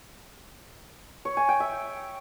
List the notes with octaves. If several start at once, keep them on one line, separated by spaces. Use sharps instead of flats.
C#5
G#5
G5
E5